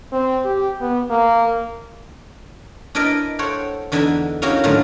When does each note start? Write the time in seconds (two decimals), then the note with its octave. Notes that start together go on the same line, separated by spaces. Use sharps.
0.12 C4
0.45 G4
0.81 B3
1.10 A#3
2.95 D4 E4 A#4 B4 D5 D#5
3.39 A4 C5 C#5 F#5 G5
3.92 E2 D3 E3 D#4 E4 E5
4.42 A#3 C#4 D#4 E4 F#4 G4
4.64 A2 D3 D#3 F#3 A3 F4